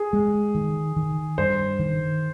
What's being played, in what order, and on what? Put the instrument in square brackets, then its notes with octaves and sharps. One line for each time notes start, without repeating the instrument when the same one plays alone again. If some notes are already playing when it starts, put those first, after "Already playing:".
Already playing: [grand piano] G#4
[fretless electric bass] G#3
D#3
D#3
[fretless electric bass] G2 [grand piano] C5
[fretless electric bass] D#3